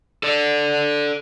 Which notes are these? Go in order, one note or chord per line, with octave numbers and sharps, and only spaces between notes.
A4 D5